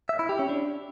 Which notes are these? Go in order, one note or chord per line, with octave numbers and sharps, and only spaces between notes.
E5
E4
G4
C#4
D4